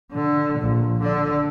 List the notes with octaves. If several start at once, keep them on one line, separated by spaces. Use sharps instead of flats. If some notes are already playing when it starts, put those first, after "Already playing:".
D3
A#1
D3 D4